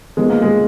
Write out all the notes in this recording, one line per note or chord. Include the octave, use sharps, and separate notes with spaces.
F3 G#3 B3 D#4 A#4
A#3
G#3